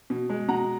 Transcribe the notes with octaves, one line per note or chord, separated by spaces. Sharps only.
B2
G#3
B2 F#5 A#5